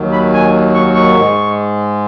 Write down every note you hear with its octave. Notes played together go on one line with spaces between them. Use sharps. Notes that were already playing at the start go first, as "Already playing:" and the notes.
Already playing: D#2 D#3 F#3
B5
G#5
C#6
C#6
G#2 G#3